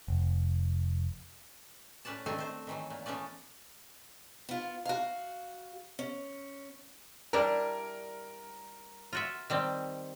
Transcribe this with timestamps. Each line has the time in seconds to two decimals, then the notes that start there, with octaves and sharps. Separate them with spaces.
0.08 F1
2.05 A2 C#4 B4 D5 A5
2.26 D3 D#3 A3 C4 A4 G#5
2.38 A3 C5
2.67 D#3 E3 F#3
2.90 A#2
3.06 E3 A3 B3 C#4 D5
4.49 B3 F4
4.85 F#4 F5
5.99 C#4
7.33 G3 D4 E4 A#4
9.13 F4 F#4 E5
9.50 D#3 G3 C4